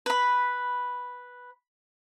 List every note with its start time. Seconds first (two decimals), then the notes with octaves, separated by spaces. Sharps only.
0.06 B4 B5